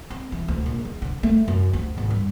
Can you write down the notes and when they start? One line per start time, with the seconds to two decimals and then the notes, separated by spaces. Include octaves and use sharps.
0.10 C4
0.32 E3
0.48 D2
0.66 A#1
0.85 E2
1.02 D3
1.23 A3
1.48 F#2
1.73 D2
1.98 G#1
2.10 G2